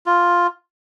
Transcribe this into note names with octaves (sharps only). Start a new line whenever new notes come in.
F4